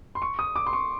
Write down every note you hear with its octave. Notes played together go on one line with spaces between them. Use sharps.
C6
C#6
D#6
D6
C6
C#6